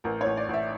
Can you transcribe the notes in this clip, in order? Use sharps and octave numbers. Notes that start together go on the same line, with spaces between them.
A1 A#4
C#5
A1
D5
A1 E5